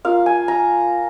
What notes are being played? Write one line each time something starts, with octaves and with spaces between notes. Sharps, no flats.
A#3 F4 F5
G#5
A#5